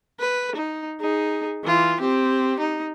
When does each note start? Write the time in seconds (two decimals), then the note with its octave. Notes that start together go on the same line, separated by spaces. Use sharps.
0.20 B4
0.56 D#4
1.01 D#4 G#4
1.64 E3 F4
2.01 C4 G4
2.60 D#4